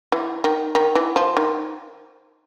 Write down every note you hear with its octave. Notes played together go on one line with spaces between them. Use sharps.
E3
D#3
D#3
E3
F3
D#3